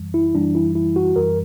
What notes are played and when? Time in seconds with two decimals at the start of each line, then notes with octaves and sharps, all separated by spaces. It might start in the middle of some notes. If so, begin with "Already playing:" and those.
Already playing: F#2 E3 G3
0.14 E4
0.35 F#2 E3 G3 D4
0.55 E4
0.75 E4
0.96 F#4
1.16 F#2 E3 G3 A#4